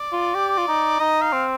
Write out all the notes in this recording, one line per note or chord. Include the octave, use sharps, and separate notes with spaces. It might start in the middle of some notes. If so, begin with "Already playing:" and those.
Already playing: D5
F4
G4
F4
D#4
D#4 D#5
F5
C4